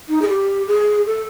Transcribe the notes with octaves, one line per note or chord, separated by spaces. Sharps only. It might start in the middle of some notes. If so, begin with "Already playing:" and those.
D#4
G#4
G4
G#4
A4